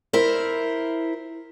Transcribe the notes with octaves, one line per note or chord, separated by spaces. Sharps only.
E4 A#4 C5